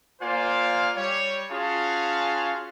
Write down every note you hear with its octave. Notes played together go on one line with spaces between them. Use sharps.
A#3 F4 C5 D5 F5 G#5
G3 C#5
C#4 F4 F#4 G#4 F5 A5